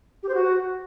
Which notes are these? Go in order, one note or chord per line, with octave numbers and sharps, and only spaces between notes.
G4
C5
F#4